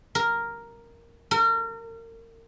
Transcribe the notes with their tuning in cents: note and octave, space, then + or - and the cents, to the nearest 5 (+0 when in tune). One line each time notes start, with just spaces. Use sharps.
A#4 +0
A#4 -35